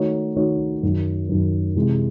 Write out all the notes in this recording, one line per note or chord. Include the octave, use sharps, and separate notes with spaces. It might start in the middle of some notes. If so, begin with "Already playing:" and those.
Already playing: D#3 A3 D#4 F#4 C#5
D#3 A3 D#4 F#4 C#5
F#2 D#3 F#3
F#2 D#3 F#3
C3 E3 G#3